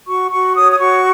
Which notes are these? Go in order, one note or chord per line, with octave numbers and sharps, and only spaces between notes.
F#4 C#6
F#4 C#6
C#5 D#6
D#6
F#4 C#6